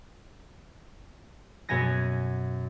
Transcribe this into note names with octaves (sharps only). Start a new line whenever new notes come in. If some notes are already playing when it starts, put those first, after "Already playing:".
F#2 B2 B3 G#5 A#6